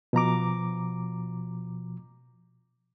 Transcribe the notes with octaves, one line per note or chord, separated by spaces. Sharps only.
B2 F3 A#5 D6